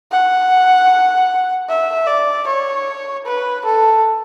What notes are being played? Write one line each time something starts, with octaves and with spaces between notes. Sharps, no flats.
F#5
E5
D5
C#5
B4
A4